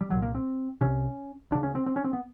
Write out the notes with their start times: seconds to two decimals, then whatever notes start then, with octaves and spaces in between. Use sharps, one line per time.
0.01 G3
0.10 C2 A#2 F#3
0.22 A#3
0.35 C4
0.81 C2 C3 C#4
1.51 D2 C#3 D4
1.63 C#4
1.75 C4
1.86 C4
1.96 C#4
2.04 C4
2.13 B3